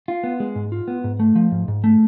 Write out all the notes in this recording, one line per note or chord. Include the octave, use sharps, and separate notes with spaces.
F4
B3
G#3
G#2
F4
B3
G#2
A3
F3
G#2
G#2
A3